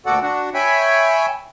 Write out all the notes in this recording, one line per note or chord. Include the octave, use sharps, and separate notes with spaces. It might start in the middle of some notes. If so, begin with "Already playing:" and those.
D2 A#2 F#4 A4 D5 F#5
D4 F#4 F#5
C#5 E5 G5 G#5 B5